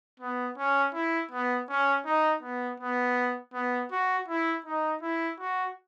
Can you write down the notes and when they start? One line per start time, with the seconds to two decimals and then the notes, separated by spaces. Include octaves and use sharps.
0.20 B3
0.58 C#4
0.94 E4
1.31 B3
1.69 C#4
2.05 D#4
2.43 B3
2.80 B3
3.54 B3
3.91 F#4
4.28 E4
4.66 D#4
5.02 E4
5.40 F#4